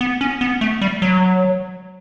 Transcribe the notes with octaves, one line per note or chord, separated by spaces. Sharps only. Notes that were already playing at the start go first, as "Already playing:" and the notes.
B3
C#4
B3
A3
G3
F#3